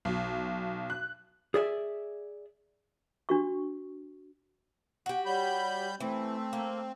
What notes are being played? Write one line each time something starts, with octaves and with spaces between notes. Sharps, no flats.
B1
F#6
G#4 D5 E5
D4 F#4 C#6
F#4 G4
G3 C#5 B5 G6
E3 A3 C4
A#3